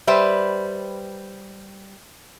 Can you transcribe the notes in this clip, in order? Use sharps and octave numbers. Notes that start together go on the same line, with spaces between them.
G3 B4 C5 E5